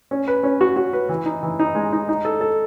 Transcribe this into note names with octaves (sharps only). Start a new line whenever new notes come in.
C#4
B4
C#4
F#4
F#4
B4
E3
D#4
E3
D#4
G#3
D#4
D#4
A4
A4